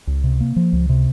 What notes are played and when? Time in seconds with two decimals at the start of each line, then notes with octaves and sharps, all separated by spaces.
0.07 C#2
0.24 C3
0.41 A#3
0.56 F3
0.73 C#2
0.89 C3